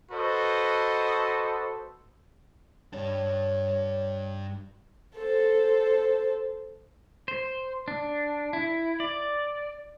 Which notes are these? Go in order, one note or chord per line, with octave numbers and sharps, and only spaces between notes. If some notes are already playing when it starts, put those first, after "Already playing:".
F#4 A4 B4 C5 D#5
G2 D4 C#5
A4 C5
C5
D4
E4
D5